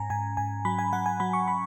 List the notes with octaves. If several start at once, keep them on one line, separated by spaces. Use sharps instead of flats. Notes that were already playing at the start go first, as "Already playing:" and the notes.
Already playing: G#2 C#4 G#5 A#5
G#2 G#5
G#2 G#5
F#3 B5
G#5
F#3 F#5
G#5
F#3 B5
C#6
B5